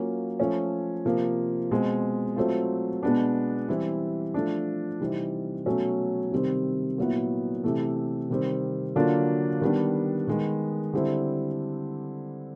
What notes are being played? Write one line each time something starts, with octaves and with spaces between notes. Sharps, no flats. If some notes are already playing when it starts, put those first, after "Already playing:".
Already playing: F#3 A#3 C#4 F4
F3 A3 C#4
C3 F3 A#3
B2 G#3 C4
F#3 A3 C4 F4
B2 G#3 B3 D4
E3 G3 C4 E4
F3 A3 D4
C3 E3 G3 C4 D#4
B2 F#3 A3 C#4
C3 D#3 G3 C4
A#2 F#3 B3 E4
C3 E3 A3
C3 D#3 G3 C4
D3 F#3 A#3 D4 F4
D#3 G3 B3 D4
D#3 G#3 B3
D3 G3 C4 E4